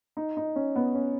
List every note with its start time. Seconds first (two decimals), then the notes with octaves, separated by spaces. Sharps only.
0.17 D#4
0.37 D#4
0.56 C#4
0.76 B3
0.95 C#4